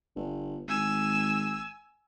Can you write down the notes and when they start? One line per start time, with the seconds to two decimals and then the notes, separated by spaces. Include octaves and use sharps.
0.16 G1
0.68 G#1 G#5 E6